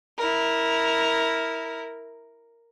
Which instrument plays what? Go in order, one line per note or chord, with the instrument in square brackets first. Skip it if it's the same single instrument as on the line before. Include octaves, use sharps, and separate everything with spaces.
[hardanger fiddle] E4 A#4